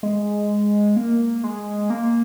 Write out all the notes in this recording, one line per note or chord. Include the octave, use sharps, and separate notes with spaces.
G#3
A#3
G#3
A#3